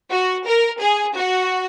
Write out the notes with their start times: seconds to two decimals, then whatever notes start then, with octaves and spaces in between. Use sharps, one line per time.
0.10 F#4
0.46 A#4
0.80 G#4
1.15 F#4